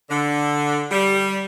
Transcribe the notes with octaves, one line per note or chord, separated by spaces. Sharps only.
D3
G3